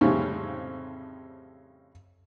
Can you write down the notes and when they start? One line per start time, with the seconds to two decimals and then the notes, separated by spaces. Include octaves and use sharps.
0.01 F2 A2 C#3 G3 C4 C#4